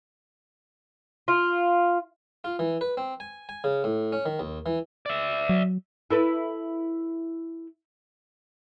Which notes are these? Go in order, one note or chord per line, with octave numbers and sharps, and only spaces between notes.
F4
F4
E3
B4
C4
G#5
G#5
C#3
A2
C#4
D#3
D#2
E3
D5 E5
F#3
E4 A4 B4